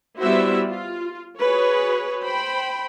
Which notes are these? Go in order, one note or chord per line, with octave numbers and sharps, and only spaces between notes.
G3 B3 E4 F#4 C5 E5
F4
F#4 G#4 B4 C#5
C5 G5 B5